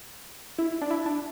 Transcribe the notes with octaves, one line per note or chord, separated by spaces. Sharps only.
E4
D4
E4
D4